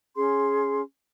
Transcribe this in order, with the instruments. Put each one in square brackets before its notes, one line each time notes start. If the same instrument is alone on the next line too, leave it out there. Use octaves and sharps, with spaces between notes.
[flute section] C#4 G#4 C6